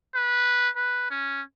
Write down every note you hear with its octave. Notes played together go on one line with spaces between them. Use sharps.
B4
B4
C#4